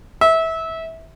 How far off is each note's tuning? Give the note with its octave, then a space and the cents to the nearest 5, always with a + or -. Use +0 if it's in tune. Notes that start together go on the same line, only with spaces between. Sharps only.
E5 -20